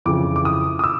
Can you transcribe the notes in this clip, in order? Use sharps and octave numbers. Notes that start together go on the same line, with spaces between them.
F2 C#3 E3 D6
D6
D#6
D#6
E6